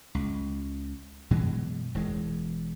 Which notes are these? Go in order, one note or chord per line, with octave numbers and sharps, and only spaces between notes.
C#2
F#2 B2 E3 G#3
E1 E3 G#3